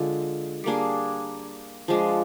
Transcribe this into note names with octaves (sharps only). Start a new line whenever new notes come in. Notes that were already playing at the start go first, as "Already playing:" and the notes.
Already playing: D3 G#3 F4
G3 A#3 D4 G#4
F3 G#3 D4